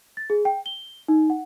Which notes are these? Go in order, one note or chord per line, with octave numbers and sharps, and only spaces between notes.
A6
G#4
G5
G7
D#4
F#5